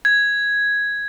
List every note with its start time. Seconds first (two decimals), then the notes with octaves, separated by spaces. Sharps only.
0.05 G#6